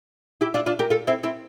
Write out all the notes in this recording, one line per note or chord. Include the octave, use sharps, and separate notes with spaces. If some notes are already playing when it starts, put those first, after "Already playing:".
E4 G4
D4 F4
D4 F4
G4 A#4
F4 A4
C4 E4
C4 E4